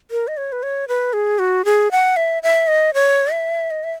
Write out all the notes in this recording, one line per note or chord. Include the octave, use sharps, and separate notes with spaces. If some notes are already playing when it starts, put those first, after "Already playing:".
A#4
D#5
C#5
B4
C#5
B4
G#4
F#4
G#4
F#5
E5
E5
D#5
C#5
E5
D#5
E5